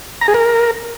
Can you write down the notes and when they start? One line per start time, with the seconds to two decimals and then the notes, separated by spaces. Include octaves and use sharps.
0.21 A#5
0.28 G#4
0.34 A#4